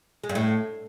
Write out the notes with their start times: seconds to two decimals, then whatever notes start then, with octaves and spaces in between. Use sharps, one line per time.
0.24 G#3
0.29 G2
0.35 A2